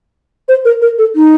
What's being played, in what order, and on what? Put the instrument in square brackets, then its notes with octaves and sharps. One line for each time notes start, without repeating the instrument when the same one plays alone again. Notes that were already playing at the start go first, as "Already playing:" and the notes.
[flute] C5
A#4
A#4
A4
D#4